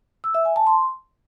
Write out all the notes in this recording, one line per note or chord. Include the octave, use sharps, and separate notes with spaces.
E6
E5
G#5
A5
C6